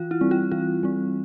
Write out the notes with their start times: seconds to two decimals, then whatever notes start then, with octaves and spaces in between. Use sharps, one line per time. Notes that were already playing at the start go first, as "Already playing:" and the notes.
Already playing: E3 F4
0.11 E4
0.21 G3 C4
0.31 F4
0.51 E3 F4
0.83 G3 C4